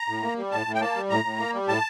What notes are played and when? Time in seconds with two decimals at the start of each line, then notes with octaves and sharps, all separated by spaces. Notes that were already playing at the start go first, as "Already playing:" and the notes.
Already playing: A#5
0.09 A2
0.23 A#3
0.37 G3
0.51 A2 A5
0.66 A2
0.75 G5
0.81 A#3 A5
0.96 G3
1.10 A2 A#5
1.24 A2
1.39 A#3
1.54 G3
1.68 A2 A5